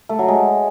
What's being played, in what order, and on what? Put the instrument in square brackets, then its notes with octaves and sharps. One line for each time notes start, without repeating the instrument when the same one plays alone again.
[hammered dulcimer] A3
F#3
G#3